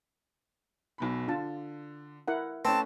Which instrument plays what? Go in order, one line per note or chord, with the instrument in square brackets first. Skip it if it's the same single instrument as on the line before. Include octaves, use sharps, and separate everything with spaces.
[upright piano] B1 B2 B5
[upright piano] D3 [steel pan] F4 A5
[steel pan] E4 A#4 F#5
[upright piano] A3 C#4 [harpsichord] C4 [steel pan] B4 [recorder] A5